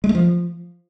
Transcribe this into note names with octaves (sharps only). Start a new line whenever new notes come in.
G#3
A3
F3